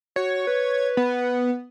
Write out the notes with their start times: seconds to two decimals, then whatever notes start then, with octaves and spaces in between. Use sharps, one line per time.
0.16 F#4 C#5
0.47 B4
0.97 B3